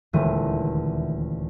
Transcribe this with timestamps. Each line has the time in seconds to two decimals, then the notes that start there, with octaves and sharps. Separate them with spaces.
0.13 D#1 D2 E3 G#3 A3 D#7